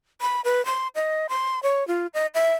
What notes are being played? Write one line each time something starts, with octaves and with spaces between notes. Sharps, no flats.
B5
B4
C6
D#5
C6
C#5
F4
D#5
E5